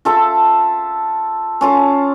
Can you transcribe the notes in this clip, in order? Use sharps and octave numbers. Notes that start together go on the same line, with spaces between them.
F4 A4 E5 A5
C#4 F4 A4